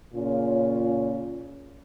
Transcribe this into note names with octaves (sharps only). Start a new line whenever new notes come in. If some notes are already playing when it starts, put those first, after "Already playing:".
A#2 C#3 C#4 F4